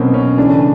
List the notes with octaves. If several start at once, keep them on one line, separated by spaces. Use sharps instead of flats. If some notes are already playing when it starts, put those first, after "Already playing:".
Already playing: B2 F#3 A#3 C4 C#4
C#4
C#3 E3 A3 D4